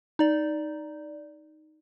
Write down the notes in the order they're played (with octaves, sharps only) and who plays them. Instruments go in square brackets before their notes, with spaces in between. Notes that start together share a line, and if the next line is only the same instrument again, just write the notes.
[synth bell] D#4 D5